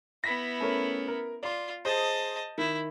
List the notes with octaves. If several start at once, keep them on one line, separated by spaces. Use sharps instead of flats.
B3 E4 A#6 B6
A3 C#4 A#4
A#4
F4 D5 C6
G#4 C5 D#5 A5
D#3 E4